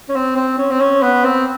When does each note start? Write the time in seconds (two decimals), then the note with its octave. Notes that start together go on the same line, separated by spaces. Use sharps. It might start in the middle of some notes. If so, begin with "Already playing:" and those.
0.09 C#4
0.15 C4
0.36 C4
0.58 C#4
0.70 C4
0.80 C#4
1.02 B3
1.25 C4